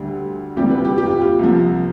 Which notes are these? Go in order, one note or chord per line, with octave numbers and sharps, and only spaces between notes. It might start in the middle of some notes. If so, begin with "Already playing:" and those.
Already playing: D2 D3 G3
D2 C3 E3 G3 G4
B4
G4
G4
F4
F4
C2 C3 F3